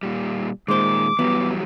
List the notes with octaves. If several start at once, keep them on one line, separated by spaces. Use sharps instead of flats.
A#2 G3
A#2 D#3 G#3 C5 D6
E3 F#3 G3 B3